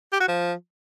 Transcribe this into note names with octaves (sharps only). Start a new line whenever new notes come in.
G4
F#4
F3